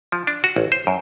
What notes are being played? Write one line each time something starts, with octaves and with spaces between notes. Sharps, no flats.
F3
D4
F#4
A1
C5
F#2